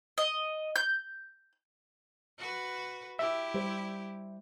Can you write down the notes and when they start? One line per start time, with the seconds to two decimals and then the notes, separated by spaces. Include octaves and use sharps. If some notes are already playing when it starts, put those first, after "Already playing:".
0.18 D#5
0.76 G6
2.39 F#4 B4
3.19 E4 G4 E5
3.54 G3 C5